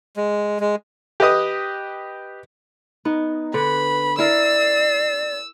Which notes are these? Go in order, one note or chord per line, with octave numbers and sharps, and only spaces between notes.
G#3
G#3
G4 B4 D#5 D#6
B3 D#4
D3 B4 B5
E4 A#4 D5 E6 C7